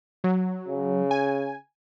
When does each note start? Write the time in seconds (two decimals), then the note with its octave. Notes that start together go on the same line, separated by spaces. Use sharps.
0.24 F#3
0.68 C#3
1.11 G#5